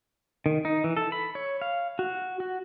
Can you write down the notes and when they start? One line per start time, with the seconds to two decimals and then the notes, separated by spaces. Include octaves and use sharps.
0.46 D#3
0.65 D#4
0.84 E3
0.97 A4
1.12 B5
1.35 C#5
1.61 F5
1.99 F#4
2.40 F#4